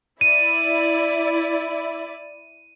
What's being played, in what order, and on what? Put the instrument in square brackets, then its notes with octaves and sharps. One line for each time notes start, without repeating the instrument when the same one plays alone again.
[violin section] E4 D5 [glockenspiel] D#7